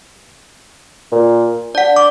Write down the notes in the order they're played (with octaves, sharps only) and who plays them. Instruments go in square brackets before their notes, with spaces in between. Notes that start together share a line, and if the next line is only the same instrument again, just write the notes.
[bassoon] A#2
[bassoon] D4 [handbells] D5 F#5
[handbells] D6